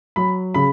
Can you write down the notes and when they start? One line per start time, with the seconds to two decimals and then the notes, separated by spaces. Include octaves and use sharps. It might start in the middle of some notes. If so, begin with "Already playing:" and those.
0.16 F#3 B5
0.54 C#3 B5